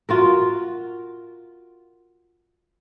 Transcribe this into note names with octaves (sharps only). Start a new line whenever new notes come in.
F4 F#4 A#4